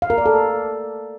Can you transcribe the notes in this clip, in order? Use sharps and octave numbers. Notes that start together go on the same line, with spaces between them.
F5
A#4
D5
A4